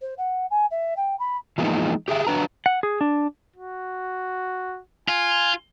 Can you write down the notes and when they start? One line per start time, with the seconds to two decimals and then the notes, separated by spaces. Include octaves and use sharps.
0.01 C5
0.18 F#5
0.50 G#5
0.71 E5
0.96 G5
1.19 B5
1.58 E3 F3 G#3 A#3 B3 D#4
2.08 G4 G#4 E5 G5
2.27 F#3 D4 B4 A#5
2.66 F#5
2.83 G#4
3.01 D4
3.56 F#4
5.08 F4 G#5